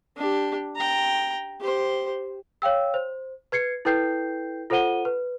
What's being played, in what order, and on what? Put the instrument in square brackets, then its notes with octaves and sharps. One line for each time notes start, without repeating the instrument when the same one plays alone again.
[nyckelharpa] D4 G4
G5 A#5
G4 C5
[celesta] C#5 F5 G5 E6
C5
B4 G#6 C7 C#7
E4 A4 B4 G5 G6 C7
F4 A4 C5 F#5 D#7 G7
B4